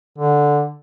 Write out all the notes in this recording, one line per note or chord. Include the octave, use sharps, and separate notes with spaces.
D3